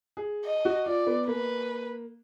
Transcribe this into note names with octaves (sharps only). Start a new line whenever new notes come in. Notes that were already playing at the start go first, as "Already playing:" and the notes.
G#4
D#5
F#4
F4 D5
B3
A#3 B4